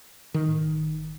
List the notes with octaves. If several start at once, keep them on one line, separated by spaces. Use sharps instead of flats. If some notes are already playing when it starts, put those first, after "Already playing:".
D#3
A2
F#1